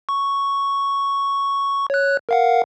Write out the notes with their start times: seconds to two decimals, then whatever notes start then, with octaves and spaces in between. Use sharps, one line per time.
0.09 C#6
1.90 C#5 F#6
2.29 A#4 F5 F#5